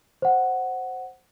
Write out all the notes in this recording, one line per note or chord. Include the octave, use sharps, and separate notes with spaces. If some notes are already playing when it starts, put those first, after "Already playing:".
C5 F#5